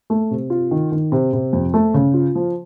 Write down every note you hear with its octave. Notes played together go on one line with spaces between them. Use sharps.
A3
C3
F4
D#3
D#3
C3
C3
F2
A3
C#3
F4
F3